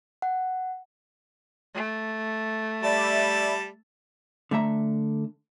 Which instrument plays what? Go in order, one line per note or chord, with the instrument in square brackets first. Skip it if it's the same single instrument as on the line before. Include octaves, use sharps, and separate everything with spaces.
[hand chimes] F#5
[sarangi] A3
[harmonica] G3 A5 [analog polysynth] D5 E5 B5
[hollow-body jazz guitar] D3 A3 E5 A#5